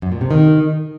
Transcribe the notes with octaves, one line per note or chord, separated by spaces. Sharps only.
F#2
A#2
C3
D#3